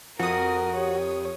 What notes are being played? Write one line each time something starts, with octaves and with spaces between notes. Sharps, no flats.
F2 F#4 A#4 D#6
G4 C#5